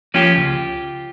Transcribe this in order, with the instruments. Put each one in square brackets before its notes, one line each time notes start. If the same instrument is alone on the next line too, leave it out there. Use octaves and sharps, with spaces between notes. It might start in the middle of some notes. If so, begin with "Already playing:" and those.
[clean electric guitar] F3 A#3 C#4 F4 G4
C#2